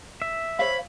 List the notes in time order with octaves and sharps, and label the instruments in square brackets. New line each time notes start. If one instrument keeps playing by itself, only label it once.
[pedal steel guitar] E5
[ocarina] C5 [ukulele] C#5 F5 [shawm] B5